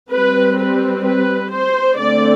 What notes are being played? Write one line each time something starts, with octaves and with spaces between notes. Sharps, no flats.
G3 C4 B4
B4
B4
C5
D3 A3 C4 D5